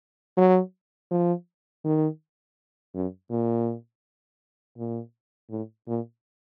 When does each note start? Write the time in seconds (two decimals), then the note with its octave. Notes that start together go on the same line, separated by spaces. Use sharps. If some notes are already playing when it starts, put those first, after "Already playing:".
0.37 F#3
1.11 F3
1.85 D#3
2.95 F#2
3.30 A#2
4.78 A#2
5.50 A2
5.88 A#2